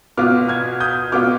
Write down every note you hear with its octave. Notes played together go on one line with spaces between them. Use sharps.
B2 B3 F4 D6 F6
F6 G#6
D#6 G6
B2 B3 F4 D6 F6